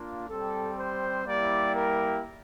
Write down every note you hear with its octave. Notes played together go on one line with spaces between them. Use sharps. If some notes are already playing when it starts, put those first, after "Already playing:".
Already playing: A#3 D4 F4
G3 C4 G4 A4
C5
G3 A#3 E4 G4 D5
A#4